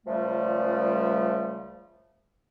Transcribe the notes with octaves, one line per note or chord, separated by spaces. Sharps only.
C#2 F3 G3 A3